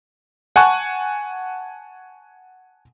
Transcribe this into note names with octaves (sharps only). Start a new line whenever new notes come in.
F#5 G#5 A5 C#6 F#6